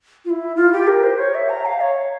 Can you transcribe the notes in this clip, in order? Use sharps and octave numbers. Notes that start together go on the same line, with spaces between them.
F4
E4
F4
G4
A#4
C5
C#5
E5
A#5
F5
C#5